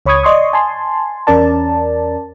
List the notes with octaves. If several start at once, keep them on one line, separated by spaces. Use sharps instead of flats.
C#2 C#5 B5 C#6 D#6 G#6
D5 D#5 C6 C#6 D#6
G#5 A5 C6
E2 C#4 A#4 D5 A5